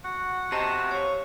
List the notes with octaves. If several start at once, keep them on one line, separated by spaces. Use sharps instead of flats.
F#4 F#5
G4 C5 D#5 A5 A#5
C#5 F5 C#6